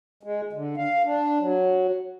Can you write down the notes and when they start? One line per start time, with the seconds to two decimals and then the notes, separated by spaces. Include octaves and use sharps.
0.23 G#3
0.53 D3
0.77 F5
1.05 D4
1.40 F#3